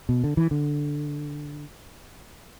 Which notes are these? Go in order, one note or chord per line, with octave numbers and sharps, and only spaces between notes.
B2
D3
E3
D3